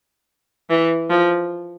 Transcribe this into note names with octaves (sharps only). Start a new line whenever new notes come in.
E3
F3